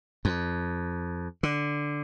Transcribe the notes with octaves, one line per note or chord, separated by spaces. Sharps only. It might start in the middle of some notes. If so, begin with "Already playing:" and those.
F2
D3